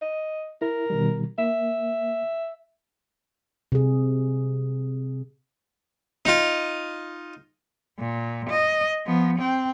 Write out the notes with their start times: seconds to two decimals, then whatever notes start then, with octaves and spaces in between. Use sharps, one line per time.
0.02 D#5
0.62 E4 A#4
0.90 B2 D#3 G3
1.38 A#3 E5
3.72 C3 G#4
6.25 D#4 F4
7.99 A#2
8.49 D#5
9.06 F3 B3
9.39 C4 G5